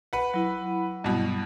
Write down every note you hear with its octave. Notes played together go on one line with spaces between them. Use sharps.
B4 F#5
F#3 E4
G2 B2